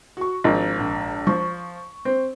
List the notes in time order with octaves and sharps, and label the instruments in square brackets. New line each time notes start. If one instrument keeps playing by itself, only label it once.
[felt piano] F#4 C#6
[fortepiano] G#1 [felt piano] F3 D4 A#4
[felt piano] A#1
[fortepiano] F3 [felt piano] C#6
[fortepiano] C4